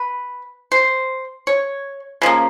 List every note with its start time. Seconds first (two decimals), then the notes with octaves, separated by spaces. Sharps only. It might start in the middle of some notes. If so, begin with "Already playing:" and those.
Already playing: B4
0.72 C5
1.47 C#5
2.22 C#3 F3 A#3